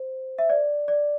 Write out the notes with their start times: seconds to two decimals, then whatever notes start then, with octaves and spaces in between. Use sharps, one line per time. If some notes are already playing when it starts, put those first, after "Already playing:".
Already playing: C5
0.38 E5
0.50 D5
0.88 D5